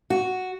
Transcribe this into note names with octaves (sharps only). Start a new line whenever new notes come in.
F#4